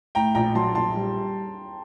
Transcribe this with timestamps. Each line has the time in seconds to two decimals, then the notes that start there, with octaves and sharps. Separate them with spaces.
0.15 A2 G5 A#5
0.35 A#1 G5 A#5
0.55 F#3 A5 C6
0.75 A#1 A5 C6
0.96 G3